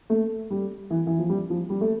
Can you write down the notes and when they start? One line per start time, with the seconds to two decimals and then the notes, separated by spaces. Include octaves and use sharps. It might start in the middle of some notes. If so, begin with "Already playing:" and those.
0.10 A3
0.50 G3
0.90 E3
1.07 E3
1.19 F3
1.29 G3
1.50 F3
1.70 G3
1.81 A3